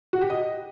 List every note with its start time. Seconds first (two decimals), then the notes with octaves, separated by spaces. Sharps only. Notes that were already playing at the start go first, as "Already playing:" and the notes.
0.13 F#4
0.21 G4
0.30 D#5